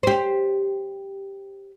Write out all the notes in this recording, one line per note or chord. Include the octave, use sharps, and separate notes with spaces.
G4 C5